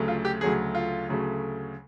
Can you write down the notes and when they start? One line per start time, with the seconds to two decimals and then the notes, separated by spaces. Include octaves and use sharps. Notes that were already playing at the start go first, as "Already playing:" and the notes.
Already playing: D2 C#3 F#3 A3
0.08 F4
0.25 G4
0.41 D2 C#3 F#3 A3 G#4
0.75 F4
1.09 D2 C#3 F#3 A3